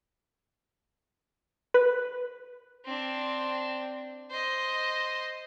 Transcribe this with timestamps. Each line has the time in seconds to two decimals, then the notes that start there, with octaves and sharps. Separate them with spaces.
1.74 B4
2.85 C4 D4
4.30 C5 D#5